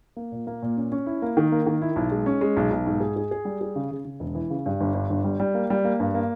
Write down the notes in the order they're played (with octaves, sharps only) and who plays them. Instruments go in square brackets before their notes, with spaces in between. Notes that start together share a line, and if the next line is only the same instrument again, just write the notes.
[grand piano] A#3
A#2
A#3
A#2
C#4
C#4
E4
A#3
D#3
A#3
D#3
E4
B1
G#3
C#4
G#3
B1
B1
G#2
G#4
G#4
G#4
G3
G#4
C#3
C#3
C#3
E1
E3
C#3
G2
G1
G2
G1
G3
G3
A#3
G3
A#3
G2
A#3